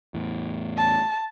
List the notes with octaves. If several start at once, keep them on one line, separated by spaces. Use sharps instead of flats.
E2 A2
A5